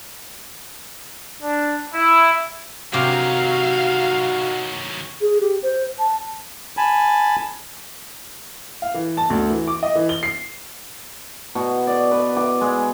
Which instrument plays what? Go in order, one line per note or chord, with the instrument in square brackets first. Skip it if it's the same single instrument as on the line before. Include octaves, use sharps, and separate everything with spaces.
[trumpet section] D4
E4
[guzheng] C3 G4 A#4 [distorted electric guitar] D#3 F#3 [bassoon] F#4 [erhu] F5
[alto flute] G#4
G4
C5
A5
[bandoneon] G#5 A5 B5
[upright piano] F5
E3
A5
D2
E3
D6
D#5
E3
G7
C7
[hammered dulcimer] B2
D5
B4
D6
G#3